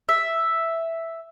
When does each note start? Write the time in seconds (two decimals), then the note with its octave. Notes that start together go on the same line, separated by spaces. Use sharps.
0.09 E5